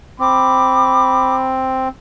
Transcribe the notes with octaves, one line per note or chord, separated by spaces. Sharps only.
C4 B5 D6